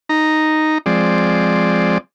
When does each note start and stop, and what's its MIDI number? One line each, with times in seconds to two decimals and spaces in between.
0.09 0.78 63
0.09 0.78 82
0.86 1.98 53
0.86 1.98 56
0.86 1.98 60
0.86 1.98 74